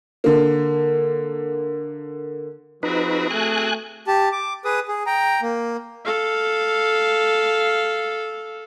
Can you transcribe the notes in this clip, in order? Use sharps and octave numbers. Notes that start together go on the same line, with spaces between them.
D3 A#3
F3 C4 D#4 F#4 G#4 B4
A3 G#5 F#6
G4 A5
D6
G#4 B4 D#6
G#4
G5 A#5
A#3
A4 F5